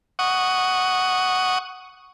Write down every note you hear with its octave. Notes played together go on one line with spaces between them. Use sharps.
F#5 C#6 D#6